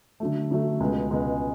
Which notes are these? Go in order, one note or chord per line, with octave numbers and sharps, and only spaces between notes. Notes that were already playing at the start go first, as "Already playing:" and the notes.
D3 F#3 A3
D3 F#3 A3
C#2 B2 G#3
C#2 B2 G#3